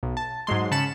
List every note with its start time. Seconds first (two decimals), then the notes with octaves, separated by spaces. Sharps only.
0.03 B1
0.17 A5
0.47 G#2 F#3 G#3 C6
0.71 C#3 A5 B5 C#7 E7